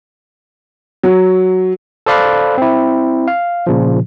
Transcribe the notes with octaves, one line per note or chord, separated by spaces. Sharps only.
F#3
A4 C5 D5 F5 B5 F#6
C4 E4
F5
A#2 C#3 F3